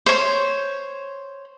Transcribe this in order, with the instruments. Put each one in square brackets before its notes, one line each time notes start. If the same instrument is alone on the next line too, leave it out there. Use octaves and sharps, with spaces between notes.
[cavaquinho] C5 C#5